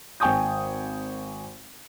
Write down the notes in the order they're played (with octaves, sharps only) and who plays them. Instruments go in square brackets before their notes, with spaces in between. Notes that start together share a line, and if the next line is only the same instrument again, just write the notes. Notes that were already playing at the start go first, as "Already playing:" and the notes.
[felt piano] G#1 G5 G#5 C#6 D#6 G6